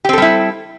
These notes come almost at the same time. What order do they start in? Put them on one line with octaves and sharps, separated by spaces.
G4 C4 A4 G3 E4